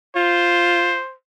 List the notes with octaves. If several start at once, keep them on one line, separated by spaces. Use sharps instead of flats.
F4 C5